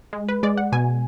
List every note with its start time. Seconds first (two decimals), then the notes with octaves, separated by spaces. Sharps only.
0.13 G#3
0.29 B4
0.43 G#3 D5
0.58 F#5
0.72 B2 G#5